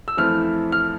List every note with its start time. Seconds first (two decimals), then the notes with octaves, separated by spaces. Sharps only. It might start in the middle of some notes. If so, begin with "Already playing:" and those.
0.08 E6
0.17 F2 E3 A3 C4 E4 F6
0.72 F6